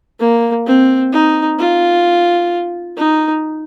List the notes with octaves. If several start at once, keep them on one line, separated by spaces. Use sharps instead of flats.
A#3
C4
D#4
F4
D#4